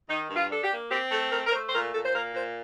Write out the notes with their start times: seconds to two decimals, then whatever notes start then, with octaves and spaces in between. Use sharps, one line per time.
0.08 D#3 D#4
0.30 G2
0.36 F4
0.50 D4 A4
0.64 G4
0.70 A#3
0.90 C4 G4
1.11 A3 A4
1.31 A3 A#4
1.46 A#4
1.52 A3 C5
1.68 C5
1.73 A#2 A#4
1.93 A#2 A4
2.04 C5
2.14 A#3 A#4
2.34 A#2 C5